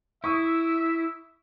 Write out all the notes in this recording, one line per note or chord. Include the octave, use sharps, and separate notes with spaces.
E4 E5 C#6 D#6